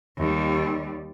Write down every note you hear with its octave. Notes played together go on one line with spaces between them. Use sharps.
D#2 G3